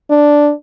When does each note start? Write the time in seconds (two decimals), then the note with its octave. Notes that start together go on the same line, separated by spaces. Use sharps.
0.10 D4